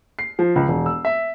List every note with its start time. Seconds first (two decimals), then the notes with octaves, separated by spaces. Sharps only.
0.19 C7
0.39 F3
0.56 C#2
0.68 E1
0.86 E6
1.05 E5